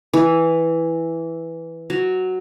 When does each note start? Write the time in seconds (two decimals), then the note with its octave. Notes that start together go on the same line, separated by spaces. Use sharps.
0.13 E3
1.90 F#3